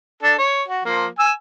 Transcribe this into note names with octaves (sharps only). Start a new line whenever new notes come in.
D4 A4
C#5
F#4
F3 A#3
G#5 E6